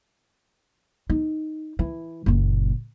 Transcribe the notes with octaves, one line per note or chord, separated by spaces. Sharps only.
D#4
E3
F#1 A#2